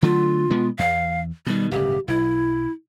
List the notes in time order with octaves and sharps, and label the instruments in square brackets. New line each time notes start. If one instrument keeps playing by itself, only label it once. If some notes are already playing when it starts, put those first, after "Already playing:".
[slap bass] D3 F#3 A3 [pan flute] F4
[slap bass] B2 G#3 B3
[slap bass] E2 [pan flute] F5
[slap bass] B2 D#3 [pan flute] G3
[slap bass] D1 G1 C#3 [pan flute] G4
[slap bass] B1 [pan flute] E4